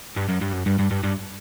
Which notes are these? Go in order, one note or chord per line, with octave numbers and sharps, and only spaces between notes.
G2
F#2
G2
F#2
G2
G2
G2
G2